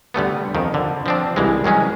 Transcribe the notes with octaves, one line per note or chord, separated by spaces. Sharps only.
D3 G3 A3 B3
F2 D#3
D3
F3 C4 D4
C2 E3 G#3
D#3 F#3 G#3 C#4